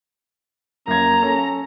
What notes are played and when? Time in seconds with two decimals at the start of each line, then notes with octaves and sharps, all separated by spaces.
0.88 F#2 A#3 A#5 G#6
1.22 C#4 A4